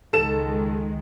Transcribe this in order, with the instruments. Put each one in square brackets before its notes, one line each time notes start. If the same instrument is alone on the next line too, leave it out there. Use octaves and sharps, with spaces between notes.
[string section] C#2 D#3 G#3 [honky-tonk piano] A4 E7